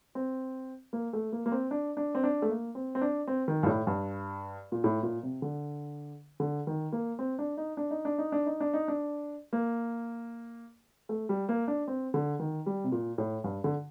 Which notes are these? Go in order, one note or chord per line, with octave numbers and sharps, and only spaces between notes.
C4
A#3
A3
A#3
A#3
C4
D4
D4
C4
D4
A3
A#3
C4
C4
D4
C4
D#3
G2
A2
G2
A#2
A2
A#2
C3
D3
D3
D#3
A#3
C4
D4
D#4
D4
D#4
D4
D#4
D4
D#4
D4
D#4
D4
A#3
A3
G3
A#3
D4
C4
D3
D#3
G3
C3
A#2
A2
G2
D3